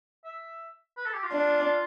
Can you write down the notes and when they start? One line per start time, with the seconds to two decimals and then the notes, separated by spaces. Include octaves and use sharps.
0.24 E5
0.97 B4
1.05 A4
1.13 G4
1.23 F4
1.32 D4